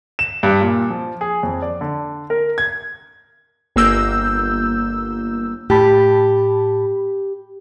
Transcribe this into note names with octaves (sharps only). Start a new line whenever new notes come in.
E7
G2
A#2
F3
G#4
F2
D5
D3
A#4
G#6
G1 A#3 E6 G6
A2 G4 A5 B5